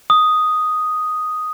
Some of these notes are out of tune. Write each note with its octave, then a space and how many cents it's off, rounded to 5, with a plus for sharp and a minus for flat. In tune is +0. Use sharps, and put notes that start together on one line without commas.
D#6 +0